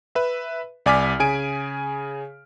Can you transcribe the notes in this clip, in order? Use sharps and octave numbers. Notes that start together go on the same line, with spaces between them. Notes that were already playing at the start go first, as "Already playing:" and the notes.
B4 E5
C2 D5 G#5 D6 F6 B6
C#3 G#4 G#5 D7